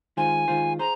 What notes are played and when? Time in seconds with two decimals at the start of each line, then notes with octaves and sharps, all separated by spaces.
0.17 D#3 G#3 F4 C5 G#5
0.48 D#3 G#3 F4 C5
0.79 G#4 C5 A#5